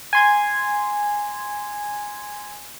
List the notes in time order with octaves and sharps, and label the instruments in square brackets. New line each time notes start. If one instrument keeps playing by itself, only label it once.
[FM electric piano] G#5 C6 G#6